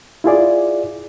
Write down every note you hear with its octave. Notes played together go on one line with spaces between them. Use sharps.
E4 F4 G#4 D5